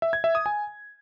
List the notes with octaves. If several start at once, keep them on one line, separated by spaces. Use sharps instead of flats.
E5
G#6
E5
D#6
G#5